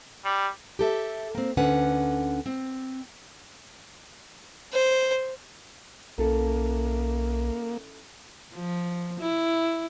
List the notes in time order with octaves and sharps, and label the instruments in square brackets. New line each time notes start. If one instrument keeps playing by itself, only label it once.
[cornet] G3
[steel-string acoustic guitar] G4 A4 E5
A#3 C4
D2 D3 C#4 B4 F#5
C4
[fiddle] C5
[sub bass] B1 [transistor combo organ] A#3 [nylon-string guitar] C#4 E4 A4
[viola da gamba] F3
E4